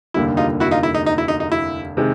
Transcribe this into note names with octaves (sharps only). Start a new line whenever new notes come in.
F1 D#2 D3 G3 A#3 E4
D#4 F4
E4 F#4
D#4 F4
E4
D#4
D#4
E4
D#4
D#4
E4
C3 D#3 G#3